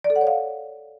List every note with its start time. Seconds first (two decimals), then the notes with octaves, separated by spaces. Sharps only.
0.04 D5
0.10 A4
0.16 F#5
0.21 C#5
0.27 F5